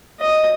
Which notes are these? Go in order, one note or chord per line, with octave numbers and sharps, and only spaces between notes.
D#5